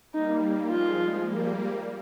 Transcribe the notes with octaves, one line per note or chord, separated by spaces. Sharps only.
G3 A#3 D#4
F3 G#3 F4
G3 A#3